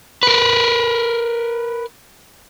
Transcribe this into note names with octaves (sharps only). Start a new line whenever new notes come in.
A#4 B4